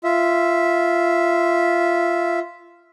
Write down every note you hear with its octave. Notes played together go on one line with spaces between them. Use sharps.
F4 E5